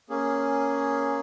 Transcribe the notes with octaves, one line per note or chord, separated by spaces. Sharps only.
A#3 C#4 G#4